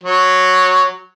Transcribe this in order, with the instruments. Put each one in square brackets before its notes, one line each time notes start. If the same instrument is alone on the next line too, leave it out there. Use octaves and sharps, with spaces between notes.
[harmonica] F#3